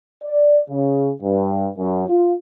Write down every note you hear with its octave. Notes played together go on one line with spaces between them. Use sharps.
D5
C#3
G2
F#2
F4